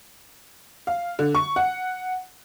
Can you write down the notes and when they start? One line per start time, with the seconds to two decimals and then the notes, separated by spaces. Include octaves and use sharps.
0.87 F5
1.19 D3
1.35 C#6
1.56 F#5